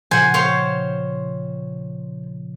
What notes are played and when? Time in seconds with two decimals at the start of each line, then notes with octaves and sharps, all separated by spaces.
0.11 A#2 C#3 F3 C5 F#5 G#5
0.34 C5 C#5 F5 G5